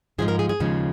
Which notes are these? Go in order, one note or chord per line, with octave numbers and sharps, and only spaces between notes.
G#2 F3 G#3 G#4
A#4
G#4
G#4
D#2 C#3 F3 G#3